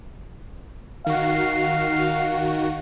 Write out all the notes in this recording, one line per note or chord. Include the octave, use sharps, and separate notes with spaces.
D#3 F#4 F5